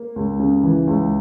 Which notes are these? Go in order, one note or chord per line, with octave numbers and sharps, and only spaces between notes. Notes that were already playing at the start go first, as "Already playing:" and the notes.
Already playing: A#3
C#2
C#3
E3
C#2